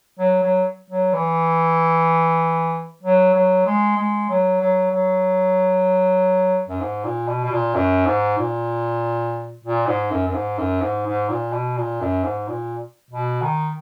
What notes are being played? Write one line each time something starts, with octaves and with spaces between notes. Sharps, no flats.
F#3
F#3
F#3
E3
F#3
F#3
G#3
G#3
F#3
F#3
F#3
F#2
G#2
A#2
B2
B2
A#2
F#2
G#2
A#2
A#2
G#2
F#2
F#2
G#2
F#2
G#2
G#2
A#2
B2
A#2
F#2
G#2
A#2
B2
D#3